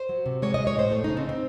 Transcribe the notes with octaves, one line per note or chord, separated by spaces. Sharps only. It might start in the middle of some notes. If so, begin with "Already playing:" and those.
Already playing: C5
F#3
C3
G#3 C#5
G#3 D#5
C#5
A2 C5
A3
C#3 D#4
C4
C4